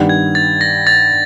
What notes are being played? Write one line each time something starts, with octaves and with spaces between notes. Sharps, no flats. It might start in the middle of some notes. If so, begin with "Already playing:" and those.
Already playing: G2 D#3 G3 B3
G#6
A6
A#6
A6